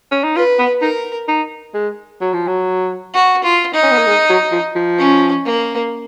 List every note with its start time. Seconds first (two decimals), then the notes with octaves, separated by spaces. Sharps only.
0.12 C#4
0.24 D#4
0.36 F4 B4
0.59 B3
0.82 D#4 A#4
1.28 D#4
1.74 G#3
2.21 F#3
2.34 F3
2.48 F#3
3.14 F#4
3.44 F4
3.74 D#4
3.83 C#4
3.91 B3
3.98 A#3
4.06 G#3
4.30 F#3
4.52 F3
4.76 F3
4.99 C#4
5.45 A#3